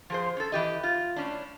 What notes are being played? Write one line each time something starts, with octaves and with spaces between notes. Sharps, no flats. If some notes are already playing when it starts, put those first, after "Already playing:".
F3 G#4 C5
C#4 A4
E3 G4 D#5
F4
A2 C#4 D4